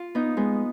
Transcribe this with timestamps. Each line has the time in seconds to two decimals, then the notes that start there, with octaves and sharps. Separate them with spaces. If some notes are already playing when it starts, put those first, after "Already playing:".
Already playing: F4
0.15 B3 D#4
0.37 G#3 B3